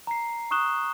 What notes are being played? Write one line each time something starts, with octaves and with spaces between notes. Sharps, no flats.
A#5 C7
C#6 D#6 F#6 E7 G7